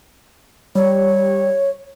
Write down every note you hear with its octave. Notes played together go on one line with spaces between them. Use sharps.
G3 C#5